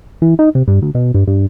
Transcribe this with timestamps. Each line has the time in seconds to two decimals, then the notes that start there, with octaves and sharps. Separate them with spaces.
0.22 E3
0.39 D#4
0.55 C3
0.68 G2
0.82 D2
0.94 B2
1.14 G2
1.27 G2